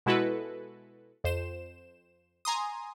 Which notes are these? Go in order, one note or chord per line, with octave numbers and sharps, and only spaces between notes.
B2 G#3 E4 F#4 A4 B4
F2 C5 E7
G#5 A#5 C6 D#6